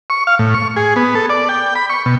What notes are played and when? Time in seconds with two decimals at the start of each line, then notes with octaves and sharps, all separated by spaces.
0.10 C#6
0.27 F5
0.39 A2
0.54 C#6
0.76 G#4
0.96 B3
1.15 A4
1.30 D5
1.49 G5
1.75 B5
1.90 C#6
2.06 B2